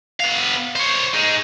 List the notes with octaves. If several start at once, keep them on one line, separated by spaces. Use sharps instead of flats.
B3 F5
C5 C#5
D#4 G#4